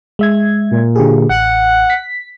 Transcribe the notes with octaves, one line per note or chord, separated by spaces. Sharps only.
G#3 E5 G#6
A#2
D3 G4 G#4
A1 F#5
B6